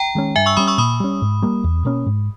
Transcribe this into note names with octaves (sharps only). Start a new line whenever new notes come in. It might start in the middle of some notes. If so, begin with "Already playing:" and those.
Already playing: G5 A#5
D#3 G#3 C#4
G2 E5 G#5
C#6 E6
G3 C#4 B5 D#6
C#6 E6
A#2 B5 D#6
G3 C#4
G#2
G3 A#3
E2
B2 A#3 C#4
G#2